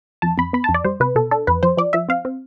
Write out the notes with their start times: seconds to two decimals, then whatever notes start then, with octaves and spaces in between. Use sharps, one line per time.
0.22 F2 A5
0.38 F2 B5
0.53 B3 B5
0.64 A5
0.69 F2
0.74 D5
0.85 G3 C5
1.00 C3 B4
1.15 B2 A4
1.31 D4 A4
1.47 F2 B4
1.63 F3 C5
1.77 F3 D5
1.93 F3 E5
2.09 C4 F5
2.25 C4